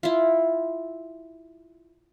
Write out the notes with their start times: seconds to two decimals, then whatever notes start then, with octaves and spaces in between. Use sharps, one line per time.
0.03 E4 F4